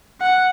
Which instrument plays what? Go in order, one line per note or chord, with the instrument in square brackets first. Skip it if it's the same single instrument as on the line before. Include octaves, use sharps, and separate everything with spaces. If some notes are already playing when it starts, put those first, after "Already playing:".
[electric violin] F#5